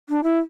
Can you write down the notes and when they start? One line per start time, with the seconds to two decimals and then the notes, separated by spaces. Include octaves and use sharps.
0.09 D4
0.23 E4